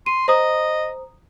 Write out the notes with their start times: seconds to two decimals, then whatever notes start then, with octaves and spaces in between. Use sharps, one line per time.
0.06 C6 D#7
0.28 C5 D#5 A#5 D#6